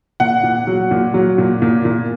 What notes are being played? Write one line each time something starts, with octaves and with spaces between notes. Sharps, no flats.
A#2 F#5
A#2
F#3
A#2
F#3
A#2
A#2
A#2